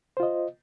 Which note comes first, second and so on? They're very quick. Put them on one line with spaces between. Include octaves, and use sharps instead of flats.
C5 F4 D#5